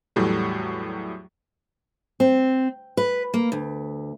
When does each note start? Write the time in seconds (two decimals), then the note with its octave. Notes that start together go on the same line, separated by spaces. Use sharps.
0.16 E2 A2 F#3 G3 A3
2.20 C4
2.97 B4
3.34 A#3
3.52 D2